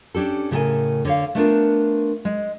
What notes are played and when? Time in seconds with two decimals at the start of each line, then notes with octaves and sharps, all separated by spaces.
0.15 C#4 D4 G4 A4
0.51 A2 C#3 G3 A4 A#4 G#5
1.05 D3 C#5 F5
1.35 A3 B3 D4 F4 A#4
2.25 G#3